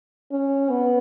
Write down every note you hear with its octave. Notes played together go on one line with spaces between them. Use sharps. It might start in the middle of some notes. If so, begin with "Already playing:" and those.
C#4
B3